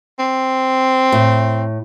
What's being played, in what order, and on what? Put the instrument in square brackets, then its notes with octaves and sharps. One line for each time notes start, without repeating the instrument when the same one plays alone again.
[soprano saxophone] C4
[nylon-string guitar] A2